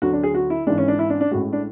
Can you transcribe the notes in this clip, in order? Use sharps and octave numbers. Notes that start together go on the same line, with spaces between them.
D2 D3 F#3 F#4
D4
G#4
F#4
E4
G#1 G#2 E3 G#3 D4
C#4
D4
E4
D4
D4
A1 A2 G#3 F#4
D4